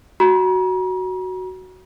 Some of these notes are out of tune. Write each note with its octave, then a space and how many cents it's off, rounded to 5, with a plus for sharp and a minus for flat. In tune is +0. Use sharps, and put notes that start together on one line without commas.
F#4 +5 A#5 +40